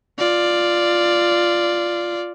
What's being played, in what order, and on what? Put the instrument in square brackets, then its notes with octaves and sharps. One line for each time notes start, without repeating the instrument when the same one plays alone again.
[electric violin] F4 D5